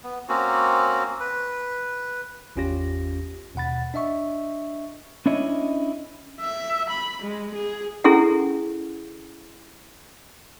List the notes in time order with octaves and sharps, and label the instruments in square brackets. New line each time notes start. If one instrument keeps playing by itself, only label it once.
[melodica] B3
A#3 C4 C#4 F#4
B4
[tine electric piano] G#1 E2 C#4 F4 G4 A#6
D#2 B2 F#5 B5 A6
D4 D#5 E5 C#6
[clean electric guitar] C#4 D4 E4 C#5 D#5
[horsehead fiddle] E5
B5
G#3
G#4
[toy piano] C#4 E4 G#4 A4 F#5